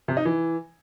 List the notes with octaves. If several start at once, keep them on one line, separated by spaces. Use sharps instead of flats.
C3
D#4
E3